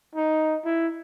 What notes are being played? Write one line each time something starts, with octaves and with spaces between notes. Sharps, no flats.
D#4
E4